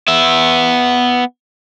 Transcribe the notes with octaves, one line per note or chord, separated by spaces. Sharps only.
B3 E5